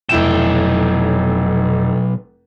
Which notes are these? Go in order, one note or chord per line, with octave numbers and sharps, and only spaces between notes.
F1 B1 E4 G5 E7